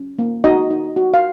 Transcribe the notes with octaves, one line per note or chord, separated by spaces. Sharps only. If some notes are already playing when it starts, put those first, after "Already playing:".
Already playing: C#4
A#3
D#4 F#4 D#5
D#4
F#4
F5